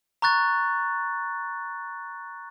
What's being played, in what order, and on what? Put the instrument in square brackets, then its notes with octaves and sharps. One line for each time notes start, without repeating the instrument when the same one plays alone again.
[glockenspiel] A#5 C#6 F#6 A6